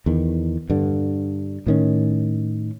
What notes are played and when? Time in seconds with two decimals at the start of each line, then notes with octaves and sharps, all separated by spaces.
0.06 E2 D#3
0.70 G2 D3
1.66 A2 D#3 C#4